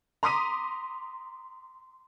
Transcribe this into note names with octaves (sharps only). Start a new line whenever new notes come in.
A#5 C6 D6 D#6 B6 D#7